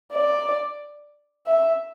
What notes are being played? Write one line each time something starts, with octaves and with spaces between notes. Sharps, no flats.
D5
E5